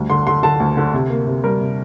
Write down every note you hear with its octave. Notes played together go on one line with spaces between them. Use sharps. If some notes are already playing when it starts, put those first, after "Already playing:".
Already playing: D2 G3
D3 C6
D3 C6
D3 A5
D2
D3
C3
A#3
C3
G3 A#4
C3